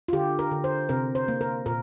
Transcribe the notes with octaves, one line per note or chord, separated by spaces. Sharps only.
F4
D3 G4
A#4
D3
C5
C3 A#4
C5
A#3
A#4
A#2 A#4